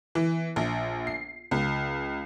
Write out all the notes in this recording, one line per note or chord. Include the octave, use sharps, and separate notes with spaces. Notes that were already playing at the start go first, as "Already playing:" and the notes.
E3
A#1
C7
C#2